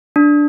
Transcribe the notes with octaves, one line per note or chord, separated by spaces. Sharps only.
D4